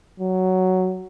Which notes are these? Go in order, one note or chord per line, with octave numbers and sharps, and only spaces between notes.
F#3